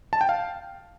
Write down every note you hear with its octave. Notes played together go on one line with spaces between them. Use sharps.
A5
G5
F5